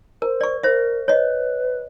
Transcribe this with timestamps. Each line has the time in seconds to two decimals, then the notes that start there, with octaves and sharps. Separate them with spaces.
0.22 A#4 C5
0.41 D5 C#6
0.63 A#4 C5 E5
1.08 B4 C#5 D#5